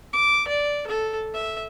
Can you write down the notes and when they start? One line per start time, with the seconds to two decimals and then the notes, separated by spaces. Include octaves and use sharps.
0.13 D6
0.48 D5
0.87 A4
1.34 E5